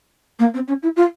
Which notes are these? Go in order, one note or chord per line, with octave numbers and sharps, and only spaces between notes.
A#3
C4
C#4
E4
F4